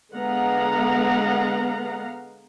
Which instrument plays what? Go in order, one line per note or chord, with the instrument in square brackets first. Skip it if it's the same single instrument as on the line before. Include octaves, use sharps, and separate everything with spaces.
[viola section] D3 G#3 B3 F5 F#5 A#5